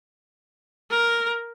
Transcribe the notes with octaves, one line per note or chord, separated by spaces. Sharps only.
A#4